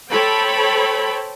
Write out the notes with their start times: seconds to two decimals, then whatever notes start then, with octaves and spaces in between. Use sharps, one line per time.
0.10 A4 C5 C#5 G5 B5